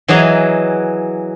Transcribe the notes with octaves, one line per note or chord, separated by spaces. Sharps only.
E3 F#3 G#4 D#5 A#5